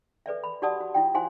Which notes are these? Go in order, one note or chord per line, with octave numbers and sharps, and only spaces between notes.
A4 B4 D5 E5
B5
F#4 G4 D5 F#5 A5 D#6
F#4
E4 F4 G5
E4 F#4 C5 F5 G#5 C6